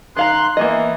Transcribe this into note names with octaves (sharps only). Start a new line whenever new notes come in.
D#3 F5 A#5 C6 F#6
E3 A#3 B3 D#5